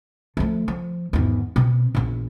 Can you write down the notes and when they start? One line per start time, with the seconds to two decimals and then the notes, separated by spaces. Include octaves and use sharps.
0.37 F3 A3
0.68 F3
1.13 G#1 E2
1.56 B2 C4
1.95 A#1 E2